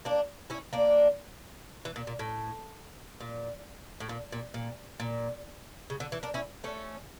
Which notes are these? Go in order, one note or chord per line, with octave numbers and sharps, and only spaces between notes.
A#3 D4
C#4 E4
A#3 D4
E3
A#2
A#2
A2
A#2
A2
A#2
A#2
A#2
A#2
C#3
D3
E3
A#3 D4
C#4 E4
A3 C#4